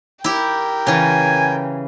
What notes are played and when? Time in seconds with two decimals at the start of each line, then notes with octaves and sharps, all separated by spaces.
0.24 E4 G4 A#4 G5
0.87 C#3 E3 G#5